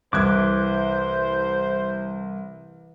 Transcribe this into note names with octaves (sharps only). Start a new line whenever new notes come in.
C2 E3 C5 D6 F#6 G#6